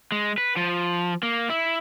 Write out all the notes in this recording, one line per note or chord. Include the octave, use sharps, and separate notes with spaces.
G#3
B4
F3
A#3
E4